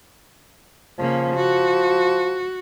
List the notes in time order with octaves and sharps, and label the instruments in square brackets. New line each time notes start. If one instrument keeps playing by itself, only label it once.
[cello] C#3 A#3 [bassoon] F3
[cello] F#4